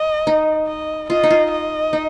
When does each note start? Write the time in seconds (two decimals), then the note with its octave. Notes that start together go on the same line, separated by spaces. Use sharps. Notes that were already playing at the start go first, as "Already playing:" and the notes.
Already playing: D#5
0.27 D#4
0.68 D#5
1.10 F4 D#5
1.24 D#4
1.30 F4
1.51 D#5
1.93 D#4